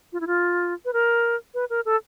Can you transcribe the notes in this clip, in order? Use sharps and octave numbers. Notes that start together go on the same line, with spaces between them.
F4
E4
F4
B4
A#4
B4
A#4
A4